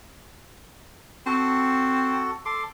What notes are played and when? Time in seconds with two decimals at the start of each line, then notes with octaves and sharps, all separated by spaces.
1.26 C4 F#4 A4
2.45 A4 C6 D6